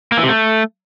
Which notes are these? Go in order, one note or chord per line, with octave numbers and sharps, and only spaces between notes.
A#3
E3
C3
A3